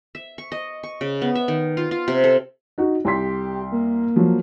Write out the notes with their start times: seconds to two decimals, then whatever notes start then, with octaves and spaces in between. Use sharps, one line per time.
0.15 E5
0.38 C#6
0.52 D#5
0.83 C#6
1.01 C#3
1.22 B3
1.35 E5
1.48 D#3
1.77 F4
1.91 F4
2.08 C3
2.24 A4
2.78 D#4 F#4
3.05 C2 G4 C6 B6
3.72 A#3
4.16 F3 F#3